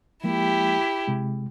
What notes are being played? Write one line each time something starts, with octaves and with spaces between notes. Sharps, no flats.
F3 G#3 A#3 E4 G4
C3 G#3